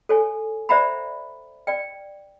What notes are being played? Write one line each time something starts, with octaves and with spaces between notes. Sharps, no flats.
A4 C#5 G#5
C5 D5 E5 F#5 A#5 B5
D5 G5